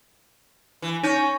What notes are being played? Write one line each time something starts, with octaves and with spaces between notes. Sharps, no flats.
E3
C#4 D#4 G6